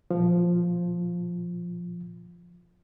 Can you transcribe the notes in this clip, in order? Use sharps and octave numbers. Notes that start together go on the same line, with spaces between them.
A#2 F3